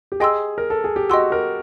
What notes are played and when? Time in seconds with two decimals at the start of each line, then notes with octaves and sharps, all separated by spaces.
0.12 G4
0.20 G#4 D#5 G5 C6 E6
0.58 A#4
0.70 A4
0.84 G#4
0.96 G4
1.10 F#4 D#5 G5 C6 E6
1.32 A#4